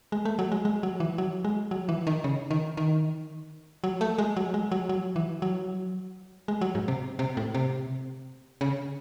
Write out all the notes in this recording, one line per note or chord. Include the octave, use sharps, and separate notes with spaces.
G#3
A3
F#3
G#3
G#3
F#3
E3
F#3
G#3
F#3
E3
D#3
C#3
D#3
D#3
F#3
A3
G#3
F#3
G#3
F#3
F#3
E3
F#3
G#3
F#3
G#2
C3
C3
A2
C3
C#3